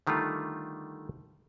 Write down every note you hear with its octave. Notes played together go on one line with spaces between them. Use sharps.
D3 D#3 G3 A3 F4